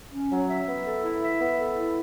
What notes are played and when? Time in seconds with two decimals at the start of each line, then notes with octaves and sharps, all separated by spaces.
0.12 C#4
0.31 F#3
0.49 E5
0.67 B3
0.85 A4
1.03 E4
1.21 E5
1.39 B3
1.57 A4
1.75 E4